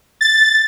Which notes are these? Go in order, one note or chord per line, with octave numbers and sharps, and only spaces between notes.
A6